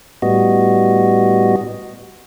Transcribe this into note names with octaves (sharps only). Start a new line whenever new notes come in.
A2 G3 B3 F#4 D#5